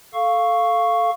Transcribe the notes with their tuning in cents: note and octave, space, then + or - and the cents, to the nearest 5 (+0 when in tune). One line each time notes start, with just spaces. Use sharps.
A4 -5 F5 +0 C#6 +0